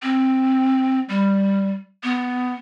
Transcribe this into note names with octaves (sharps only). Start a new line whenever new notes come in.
C4
G3
B3